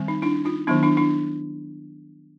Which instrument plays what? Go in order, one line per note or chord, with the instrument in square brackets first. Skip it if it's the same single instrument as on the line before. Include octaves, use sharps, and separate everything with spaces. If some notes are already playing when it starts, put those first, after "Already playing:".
Already playing: [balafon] D#3 G3 C4
D#4
D4 E4
D#4 F4
D#3 F#3 B3 D4 E4
D4 E4
D4 E4